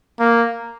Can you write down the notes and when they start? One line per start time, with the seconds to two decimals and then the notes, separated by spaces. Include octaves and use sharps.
0.19 A#3